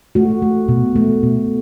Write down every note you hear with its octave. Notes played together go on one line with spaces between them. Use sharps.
A3 F#4
A3
B2
A3
B2